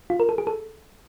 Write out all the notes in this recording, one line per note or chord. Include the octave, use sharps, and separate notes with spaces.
F4
A#4
A4
G#4
A4